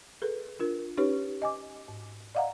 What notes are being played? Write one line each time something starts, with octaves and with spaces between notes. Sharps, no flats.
G#4 A4 B4
D4 F4 A#4
C#4 D#4 G4 B4 C#5
D#5 G#5 D6
G#2
D5 D#5 F5 F#5 A#5